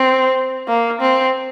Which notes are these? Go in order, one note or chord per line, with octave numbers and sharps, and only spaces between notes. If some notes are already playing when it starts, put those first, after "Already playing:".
Already playing: C4
A#3
C4